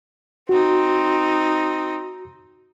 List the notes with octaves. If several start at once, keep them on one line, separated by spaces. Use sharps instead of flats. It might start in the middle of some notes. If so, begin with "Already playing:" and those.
C4 D#4 F#4